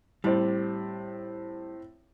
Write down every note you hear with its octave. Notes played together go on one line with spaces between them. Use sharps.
A2 G3 C4